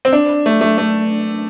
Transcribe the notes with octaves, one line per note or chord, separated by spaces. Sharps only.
C4
D4
A3
A3
A3